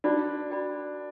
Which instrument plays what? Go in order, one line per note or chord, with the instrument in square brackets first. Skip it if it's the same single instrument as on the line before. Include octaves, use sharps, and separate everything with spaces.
[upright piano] D4 [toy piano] F#4 A#4 D5 G5 B5
[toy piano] F#4 A#4 D5 G5 B5